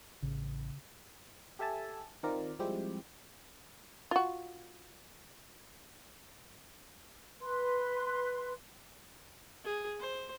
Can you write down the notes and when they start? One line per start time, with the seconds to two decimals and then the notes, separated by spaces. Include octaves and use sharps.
0.23 A1 C#3
1.59 G4 A4 E5 G#5 A5
2.23 D#3 C4 F4 A#4 D5
2.59 F3 G3 G#3 C4 E4 G4
4.11 F4 F#4
7.41 B4 C6
9.64 G#4
10.00 C5